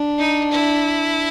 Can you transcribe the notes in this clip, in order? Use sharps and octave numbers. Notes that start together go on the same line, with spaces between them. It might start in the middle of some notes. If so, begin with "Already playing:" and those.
Already playing: D4
D#4
E4